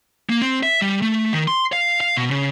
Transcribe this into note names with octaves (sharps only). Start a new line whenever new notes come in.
A#3
C4
E5
G3
A3
D#3
C6
F5
F5
B2
C#3